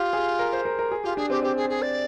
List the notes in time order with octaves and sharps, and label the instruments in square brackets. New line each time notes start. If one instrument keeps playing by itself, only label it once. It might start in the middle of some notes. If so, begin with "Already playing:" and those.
Already playing: [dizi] F4 [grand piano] G4
[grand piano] G#4
A#4
C5
A#4
A#4
G#4
[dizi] F4 [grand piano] G4
[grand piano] D4 [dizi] G#4
[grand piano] C4 [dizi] G4
[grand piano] C4 [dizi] G4
[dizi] G#4
G#4
D5